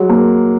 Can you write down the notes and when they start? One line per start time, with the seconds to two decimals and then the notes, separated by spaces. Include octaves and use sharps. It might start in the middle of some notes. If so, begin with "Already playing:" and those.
Already playing: F#3 G#3
0.09 A#3